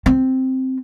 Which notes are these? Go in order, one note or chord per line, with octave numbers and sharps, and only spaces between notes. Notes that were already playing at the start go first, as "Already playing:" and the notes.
C4